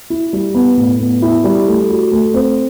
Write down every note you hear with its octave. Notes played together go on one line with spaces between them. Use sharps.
E4
G3
B3
A2
B3
E4
G3
A3
F#4
A3
C4